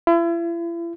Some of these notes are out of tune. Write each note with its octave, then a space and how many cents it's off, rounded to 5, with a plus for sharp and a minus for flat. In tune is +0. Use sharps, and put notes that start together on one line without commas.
E4 +40